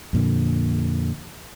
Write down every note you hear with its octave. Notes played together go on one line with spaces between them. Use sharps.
F2 A#2 D3